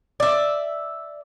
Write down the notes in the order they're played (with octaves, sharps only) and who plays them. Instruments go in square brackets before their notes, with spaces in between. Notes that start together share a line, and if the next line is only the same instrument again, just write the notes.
[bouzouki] D5 E5